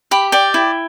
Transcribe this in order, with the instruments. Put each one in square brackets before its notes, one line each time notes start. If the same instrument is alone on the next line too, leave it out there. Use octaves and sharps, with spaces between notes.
[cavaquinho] G4 B5
D5 G5
E4